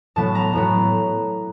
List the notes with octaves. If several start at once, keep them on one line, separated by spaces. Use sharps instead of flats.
A2 F#3 B3 A5
A#5
A2 F#3 B3